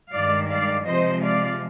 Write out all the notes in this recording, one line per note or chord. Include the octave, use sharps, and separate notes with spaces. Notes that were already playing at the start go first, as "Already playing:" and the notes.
G2 D#3 G#3 D5 F5
D5 F5
C3 F3 G#3 C5 D#5
D5 F5